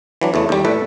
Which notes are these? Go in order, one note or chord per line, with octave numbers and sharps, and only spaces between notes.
E3 F#3 D4
E2 C#3 A3
D#2 G3
A2 A3 A4 B4 E5